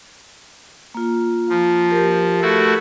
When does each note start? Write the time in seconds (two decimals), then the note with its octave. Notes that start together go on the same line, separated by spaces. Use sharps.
0.95 A#3 F4
1.49 F3
1.91 G4 A#4
2.42 A3 E4 F#4